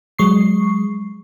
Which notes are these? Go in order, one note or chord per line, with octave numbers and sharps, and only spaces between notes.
F#3 G#3 C#6 C7